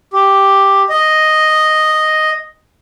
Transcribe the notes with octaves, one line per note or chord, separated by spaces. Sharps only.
G4
D#5